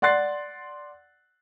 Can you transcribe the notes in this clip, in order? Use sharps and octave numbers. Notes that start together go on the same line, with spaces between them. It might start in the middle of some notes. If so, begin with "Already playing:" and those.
D5 F#5 C6 F#6 A6 C7